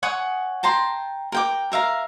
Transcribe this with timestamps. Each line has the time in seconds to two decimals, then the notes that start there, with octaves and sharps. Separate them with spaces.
0.03 C#5 F#5 G#5 D#6
0.63 G5 A5 A#5 C6
1.32 A#4 G5 D6
1.72 A#4 E5 F5 A#5